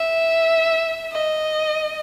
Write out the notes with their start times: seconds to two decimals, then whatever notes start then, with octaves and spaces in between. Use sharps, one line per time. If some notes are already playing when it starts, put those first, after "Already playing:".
Already playing: E5
1.12 D#5